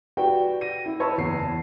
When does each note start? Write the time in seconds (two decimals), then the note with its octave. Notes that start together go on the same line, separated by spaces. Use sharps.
0.17 F#4 G4 B4 D5 G5
0.61 A#6 D#7
0.86 E4
1.00 B4 C#5 A5 B5 E6
1.17 F#1 E2 C7
1.39 A5